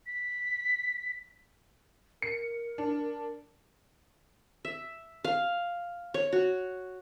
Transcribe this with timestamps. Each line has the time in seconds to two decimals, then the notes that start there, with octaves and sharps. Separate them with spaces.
0.07 B6
2.22 A#4 C#7
2.78 D4
4.65 E5
5.24 F5
6.14 C#5
6.33 F#4